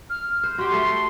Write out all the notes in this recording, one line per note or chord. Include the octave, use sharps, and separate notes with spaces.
F6
C5
F#4 G4 C6
A3 A4